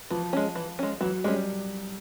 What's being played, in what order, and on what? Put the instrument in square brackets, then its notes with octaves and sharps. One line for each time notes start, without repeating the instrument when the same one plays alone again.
[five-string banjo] E3 [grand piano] F3
[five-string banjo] G#3 C#4
E3
G#3 C#4
[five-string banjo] E3 [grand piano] F#3
[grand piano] G3 [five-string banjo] G#3
[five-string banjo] C#4